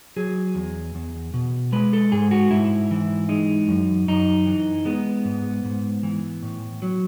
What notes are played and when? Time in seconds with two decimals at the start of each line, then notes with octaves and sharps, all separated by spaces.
0.16 F#3 G#4
0.55 E2
0.95 E2
1.34 B2
1.72 G#3 B4
1.93 A4
2.12 G#2 G#4
2.31 F#4
2.51 G#2 E4
2.91 E3
3.29 G#3 D#4
3.68 F#2
4.08 F#2 D#4
4.46 E3
4.85 G#3 B3
5.25 G#2
5.65 G#2
6.03 E3
6.42 A2
6.82 F#3